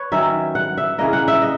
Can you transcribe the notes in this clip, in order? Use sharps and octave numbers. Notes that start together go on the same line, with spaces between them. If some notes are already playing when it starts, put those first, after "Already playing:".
Already playing: B4 C#5
D#3 F#3 C#4 E5
F#5
E5
C#3 E3 A#3 D#5
F#5
E5
D#5